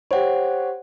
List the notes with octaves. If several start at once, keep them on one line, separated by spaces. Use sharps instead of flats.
G4 C5 C#5 F#5